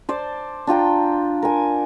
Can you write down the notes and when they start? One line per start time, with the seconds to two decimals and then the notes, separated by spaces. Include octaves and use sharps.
0.09 C5 D5 A5
0.67 D4 F4 G5 A#5
1.42 A#4 G#5